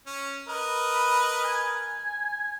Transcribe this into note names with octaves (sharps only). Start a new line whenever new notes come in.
C#4
A#4 B4 D#5
B5
G#5